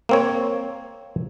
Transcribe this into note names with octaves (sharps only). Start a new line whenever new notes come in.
A#3 C4 C#5